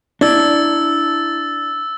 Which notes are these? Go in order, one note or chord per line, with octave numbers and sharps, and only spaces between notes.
D4 E4 E6 G#6 A6